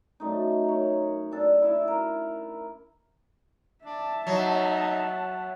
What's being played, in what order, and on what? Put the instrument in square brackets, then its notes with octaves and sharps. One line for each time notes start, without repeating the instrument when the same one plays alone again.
[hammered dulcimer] F#2 A3 D#4
A#4 C#5
D4 A4 A5
E4 E5
A#4
[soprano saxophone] D4 [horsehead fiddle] E5 A5
[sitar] F#3 [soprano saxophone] D#4